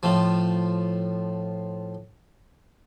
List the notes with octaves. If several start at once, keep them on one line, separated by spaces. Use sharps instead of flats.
A2 F3